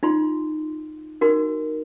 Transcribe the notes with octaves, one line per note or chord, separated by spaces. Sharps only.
D#4 F4 C6
D#4 F#4 A#4